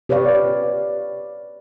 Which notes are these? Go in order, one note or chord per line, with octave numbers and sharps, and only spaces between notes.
G4 B4 C#5 D5 F5